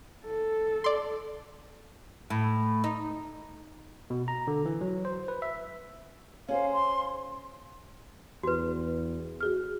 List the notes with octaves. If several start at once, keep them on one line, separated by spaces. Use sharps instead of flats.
A4
D5 C6
A2
D#4
B2
A#5
D3
E3
F#3
C5
B4
E5
C#4 G#4 C5 F5
C6
E2 F#4 B4
F#4 G#4 F6